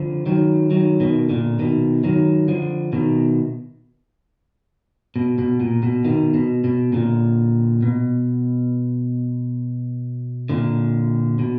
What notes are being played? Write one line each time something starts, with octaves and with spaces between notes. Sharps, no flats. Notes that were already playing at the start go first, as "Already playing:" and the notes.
Already playing: D3 F3
D#3 F#3
D#3 F#3
B2 D#3
A#2 D3
B2 D#3
D#3 F#3
D3 F3
B2 D#3
B2
B2
A#2
B2
B2 D#3
B2
B2
A#2 D3
B2
A#2 D3
B2